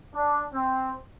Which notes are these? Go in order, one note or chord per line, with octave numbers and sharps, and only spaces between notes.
D4
C4